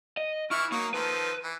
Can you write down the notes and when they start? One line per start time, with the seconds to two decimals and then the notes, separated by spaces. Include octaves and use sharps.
0.17 D#5
0.51 E3 E4 C#6 F6
0.72 F#3 A#3 D#4 C#6
0.94 D#3 F3 A4 B4
1.44 E3